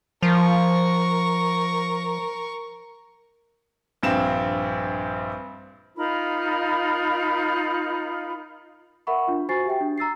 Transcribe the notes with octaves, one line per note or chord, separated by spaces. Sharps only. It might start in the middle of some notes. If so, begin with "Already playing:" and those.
F3 A#4 C#6
A#1 G2 C4 E7
D#4 F4 A#4 B5
A#4 E5 F#5 B5 C#6
D4 F4
F#4 C5 G#5 C#6 A6 C7
G4 E5 G5
D4
A#5 E6 A6 C7